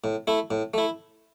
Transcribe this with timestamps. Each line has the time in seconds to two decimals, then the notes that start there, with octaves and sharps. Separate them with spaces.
0.04 A2
0.27 A3 E4
0.51 A2
0.74 A3 E4